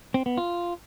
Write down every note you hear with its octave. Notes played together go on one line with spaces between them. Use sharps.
C4
B3
F4